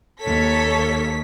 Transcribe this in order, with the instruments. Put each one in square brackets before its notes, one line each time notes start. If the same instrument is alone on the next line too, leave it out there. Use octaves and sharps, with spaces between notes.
[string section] D#2 B6 [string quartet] A4 C#5